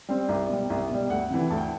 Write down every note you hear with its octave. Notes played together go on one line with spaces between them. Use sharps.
G3 C4
C2 D5
B2 G3
C2
B2 G3
D2 F#5
C3 E3
D2 A5
G5